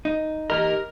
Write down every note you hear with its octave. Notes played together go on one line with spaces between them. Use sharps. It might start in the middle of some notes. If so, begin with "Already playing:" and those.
D#4
G4 A#4 D#5